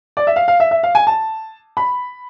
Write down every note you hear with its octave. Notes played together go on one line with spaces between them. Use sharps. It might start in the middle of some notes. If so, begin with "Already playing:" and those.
D5
E5
F5
F5
E5
E5
F5
G#5
A5
B5